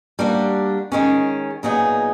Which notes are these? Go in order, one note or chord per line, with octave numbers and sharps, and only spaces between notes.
G3 A#3 D4 F#4
D#3 G#3 C#4
A#2 F#3 B3 D#4 G#4